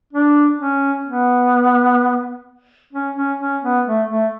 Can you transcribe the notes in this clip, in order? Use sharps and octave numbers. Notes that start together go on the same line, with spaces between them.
D4
C#4
B3
C#4
C#4
C#4
B3
A3
A3